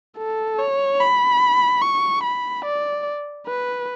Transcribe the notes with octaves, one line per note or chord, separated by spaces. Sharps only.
A4
C#5
B5
C#6
B5
D5
B4